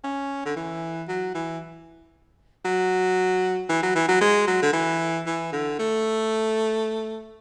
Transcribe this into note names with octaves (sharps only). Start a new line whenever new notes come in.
C#4
D3
E3
F#3
E3
F#3
E3
F#3
E3
F#3
G#3
F#3
D3
E3
E3
D3
A3